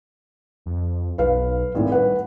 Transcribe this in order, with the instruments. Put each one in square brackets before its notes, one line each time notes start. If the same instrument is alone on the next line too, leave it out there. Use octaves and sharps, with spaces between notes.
[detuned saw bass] F2
[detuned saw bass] B1 [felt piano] B4 F5
[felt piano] G#1 A2
[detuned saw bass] G2 [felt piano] B4 F#5